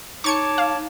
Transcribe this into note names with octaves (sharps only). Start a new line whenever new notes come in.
D#4 C#5 A5 C#6 D6 G#6 C#7
F5